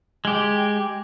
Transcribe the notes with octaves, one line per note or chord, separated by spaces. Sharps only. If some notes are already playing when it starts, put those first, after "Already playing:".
G#3 G4